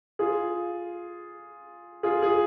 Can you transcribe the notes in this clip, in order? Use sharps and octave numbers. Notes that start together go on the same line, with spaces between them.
F4 G#4
F4 G#4
G#4